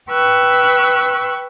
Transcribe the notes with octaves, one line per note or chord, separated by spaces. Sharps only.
B4 G5 C#6 E6 F#6